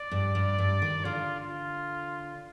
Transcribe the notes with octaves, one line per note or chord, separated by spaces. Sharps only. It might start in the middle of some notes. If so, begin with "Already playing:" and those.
Already playing: D5
G2
G2
G2
D#3
D3 F4
F4